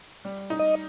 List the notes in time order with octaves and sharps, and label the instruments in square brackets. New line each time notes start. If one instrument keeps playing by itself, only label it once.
[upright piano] G3
D#4
[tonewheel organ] D#5